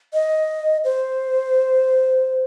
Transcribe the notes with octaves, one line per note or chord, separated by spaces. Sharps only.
D#5
C5